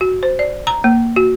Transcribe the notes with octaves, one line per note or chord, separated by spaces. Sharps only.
F#4
C5
D5
A#5
A#3
F#4